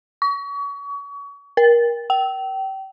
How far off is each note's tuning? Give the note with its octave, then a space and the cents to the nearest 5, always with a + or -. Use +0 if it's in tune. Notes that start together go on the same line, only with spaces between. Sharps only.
C#6 +35
A#4 +25
G5 -30